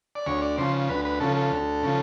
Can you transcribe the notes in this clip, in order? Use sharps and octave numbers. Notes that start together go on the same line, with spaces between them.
D5
D2 C#5
D5
C#3 F3 C5
D2 B4
B4
C#3 F3 A4
A4
D2
C#3 F3